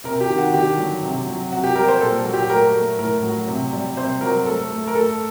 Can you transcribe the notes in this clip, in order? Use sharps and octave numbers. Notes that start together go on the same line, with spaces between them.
C3 A#4
G4
D#3
F#4
D3 G4
F#3
C3
F#3
C3 F#4
G4
G3 A#4
C5
A#2 A4
F#3
G4
A3 A#4
A3
A2 A#4
F#3
C3
G3
C3 C5
F#3 A#4
A3 A4
A3
A#4
A3 A4